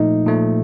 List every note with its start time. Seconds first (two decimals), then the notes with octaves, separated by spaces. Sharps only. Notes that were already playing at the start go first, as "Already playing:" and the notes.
Already playing: A#2 F3 A3 D#4
0.26 A#2 F3 A3